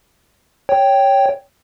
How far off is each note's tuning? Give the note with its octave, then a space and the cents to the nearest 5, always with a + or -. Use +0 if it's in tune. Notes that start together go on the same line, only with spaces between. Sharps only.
C#5 +5 G5 +0